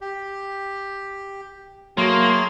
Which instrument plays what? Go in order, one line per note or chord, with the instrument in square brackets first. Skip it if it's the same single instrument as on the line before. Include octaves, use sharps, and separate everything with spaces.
[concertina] G4
[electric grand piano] F#3 [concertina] A3 G#4 F6 [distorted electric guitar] A#3 [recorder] C6